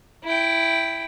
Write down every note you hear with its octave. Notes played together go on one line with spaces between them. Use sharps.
E4 G5